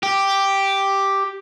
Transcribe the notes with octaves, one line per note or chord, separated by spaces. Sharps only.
G4